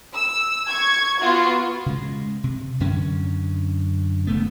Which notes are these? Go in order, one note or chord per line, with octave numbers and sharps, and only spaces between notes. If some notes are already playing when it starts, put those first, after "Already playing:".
E6
C#6 G#6
B3 F4 F#4
C#3 G#3
C3
F#2 D3 C#4
D#1 C#3 A3 B3